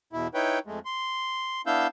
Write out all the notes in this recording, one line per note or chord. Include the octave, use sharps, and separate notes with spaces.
E2 B2 E4
D#4 E4 B4 C#5 G5
F2 G#3 A3
C6
B3 D4 E4 F5 E6 G6